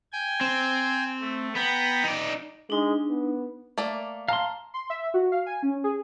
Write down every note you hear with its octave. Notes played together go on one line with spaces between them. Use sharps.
G5 G#5
C4
A3
B3 G5 A#5 B5
D#4 D5
G#3 D4 D#4
B3
A3 A#3 D5
F5 A5 A#5 C6
C6
E5
F#4
F5
G#5
C#4
G#4